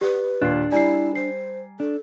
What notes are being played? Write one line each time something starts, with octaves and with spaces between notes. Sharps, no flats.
G4 B4 D5
D#2 A#2 D4 F#6 C7
G3 E4 D5 G#5 A#5 C7
C5 C7
D4 A4